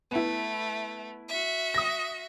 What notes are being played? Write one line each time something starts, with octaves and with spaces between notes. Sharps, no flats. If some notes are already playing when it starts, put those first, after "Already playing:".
A3 B3 E4
F#4 E5
D#6 A#6